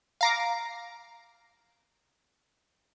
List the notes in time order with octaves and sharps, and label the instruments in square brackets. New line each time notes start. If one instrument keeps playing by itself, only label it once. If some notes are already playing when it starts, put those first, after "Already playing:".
[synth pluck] F5 A#5 D6